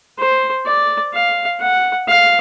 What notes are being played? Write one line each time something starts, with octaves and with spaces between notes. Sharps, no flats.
C5
D5
F5
F#5
F5